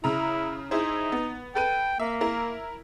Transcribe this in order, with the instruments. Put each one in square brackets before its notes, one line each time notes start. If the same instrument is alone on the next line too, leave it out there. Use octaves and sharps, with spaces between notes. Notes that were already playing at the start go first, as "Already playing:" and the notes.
[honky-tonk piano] C#3 A#5 [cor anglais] E4
[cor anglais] D#4 [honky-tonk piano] E4 G#4 C5
[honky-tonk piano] B3
[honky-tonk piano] A4 B4 D#7 [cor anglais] G5
[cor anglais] A#3 [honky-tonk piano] E5
[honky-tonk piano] E4 A#4